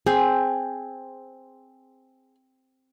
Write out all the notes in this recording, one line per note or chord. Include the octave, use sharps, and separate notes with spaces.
C4 G#4